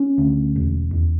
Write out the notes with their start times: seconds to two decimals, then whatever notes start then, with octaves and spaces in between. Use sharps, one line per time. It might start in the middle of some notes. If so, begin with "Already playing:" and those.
Already playing: C#4
0.18 D2
0.56 E1
0.93 E2